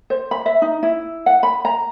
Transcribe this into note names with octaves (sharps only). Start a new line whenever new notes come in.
C5
B5
E5
D#4
E4
F#5
B5
A#5